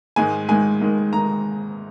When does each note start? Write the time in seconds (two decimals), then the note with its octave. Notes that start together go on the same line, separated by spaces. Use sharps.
0.16 G#2 D#3 G#3 G#5
0.48 G#2 D#3 G#3 G#5
0.82 G#2 D#3 G#3
1.13 D#3 G#3 A#5